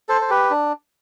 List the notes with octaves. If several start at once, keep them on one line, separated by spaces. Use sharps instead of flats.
A4 C5
C5
G4 B4
D4